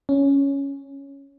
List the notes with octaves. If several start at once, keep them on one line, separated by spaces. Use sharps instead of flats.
C#4